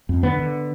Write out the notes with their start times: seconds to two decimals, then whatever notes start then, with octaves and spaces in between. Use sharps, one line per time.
0.09 F2
0.23 D3 B3
0.39 D3